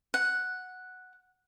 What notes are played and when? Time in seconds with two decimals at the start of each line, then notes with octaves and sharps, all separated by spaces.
0.14 F#5